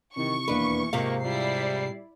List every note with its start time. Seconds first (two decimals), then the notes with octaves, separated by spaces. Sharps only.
0.16 C3 D#3 E3 C#6
0.48 E1 D#2 E3 A#3 D4 B4
0.93 G#2 C3 A#3 F4 F5
1.25 G3 E4 F4 D5 C7